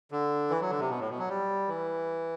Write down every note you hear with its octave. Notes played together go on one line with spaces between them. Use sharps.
D3
E3
F#3
D3
C3
B2
A2
B2
F#3
G3
E3